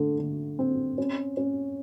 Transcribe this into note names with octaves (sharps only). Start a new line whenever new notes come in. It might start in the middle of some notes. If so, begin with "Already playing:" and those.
Already playing: D3 A3
D3
C4
C#4
C#4